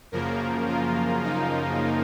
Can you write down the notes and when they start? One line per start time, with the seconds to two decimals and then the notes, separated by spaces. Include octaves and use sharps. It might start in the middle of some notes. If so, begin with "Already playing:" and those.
0.12 F#2 C#3 F3 A#3 A#4
0.68 F4
1.24 D#4